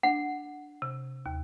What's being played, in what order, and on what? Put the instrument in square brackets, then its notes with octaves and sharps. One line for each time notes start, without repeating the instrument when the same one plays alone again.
[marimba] D4 [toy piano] F#5
[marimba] C3
D#2